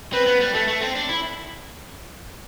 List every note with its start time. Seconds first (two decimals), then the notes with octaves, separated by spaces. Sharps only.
0.13 C4 B4
0.27 B3
0.40 G3
0.54 A3 A4
0.68 A3
0.81 C4
0.95 D4
1.09 E4